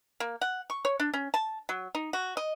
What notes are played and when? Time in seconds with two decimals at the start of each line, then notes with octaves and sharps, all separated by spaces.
0.20 A#3
0.41 F#5
0.70 C#6
0.85 C#5
1.00 D4
1.14 C#4
1.34 A5
1.69 F#3
1.95 D#4
2.13 F#4
2.37 D#5